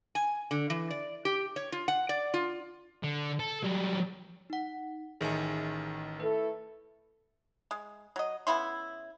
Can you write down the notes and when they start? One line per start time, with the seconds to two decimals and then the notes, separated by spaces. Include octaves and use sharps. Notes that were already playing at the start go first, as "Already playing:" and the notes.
0.15 G#5
0.51 D3
0.70 E3
0.91 D5
1.25 G4
1.56 C#5
1.72 F4
1.88 F#5
2.09 D5
2.34 F4
3.03 D3
3.40 A4
3.63 F#3 G3
4.50 D#4 F#5
5.21 A1 D#3 G#4 E5 G#5
6.20 A3 E4 A4 B4
7.71 G#3
8.16 F#3 D#5
8.47 C#3 B3 E4 C6